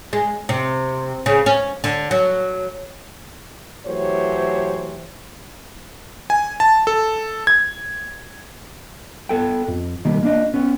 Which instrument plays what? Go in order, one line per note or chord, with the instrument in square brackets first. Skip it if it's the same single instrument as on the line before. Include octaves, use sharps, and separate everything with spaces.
[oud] G#3
C3
C#3
C#4
D3
F#3
[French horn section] E3 F#3 A3 G4 C5 C#5
[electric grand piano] G#5
A5
A4
G#6
[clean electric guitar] B3 A4 G5
F2
B1 D#3 G3 A#3
A#3 D4 D#5
B3 C#4